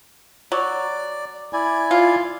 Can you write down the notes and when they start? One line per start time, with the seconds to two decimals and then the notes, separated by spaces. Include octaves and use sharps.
0.52 F#3 D5
1.53 E4 D5 G#5
1.91 F4